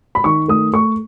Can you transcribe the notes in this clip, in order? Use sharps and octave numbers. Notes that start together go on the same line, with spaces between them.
B5
D#3 C#6
A3 D#6
A3 C#6